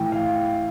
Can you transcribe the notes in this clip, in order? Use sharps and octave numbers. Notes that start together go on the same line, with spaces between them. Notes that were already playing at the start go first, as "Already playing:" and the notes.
Already playing: A2 E3 G5
F5